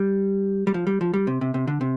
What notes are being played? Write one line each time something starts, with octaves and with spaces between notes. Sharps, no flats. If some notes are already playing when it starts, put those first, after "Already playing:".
Already playing: G3
G3
F3
G3
F3
G3
C3
C3
C3
D3
C3